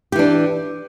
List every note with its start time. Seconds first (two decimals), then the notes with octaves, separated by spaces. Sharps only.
0.12 G4
0.16 E3
0.19 D4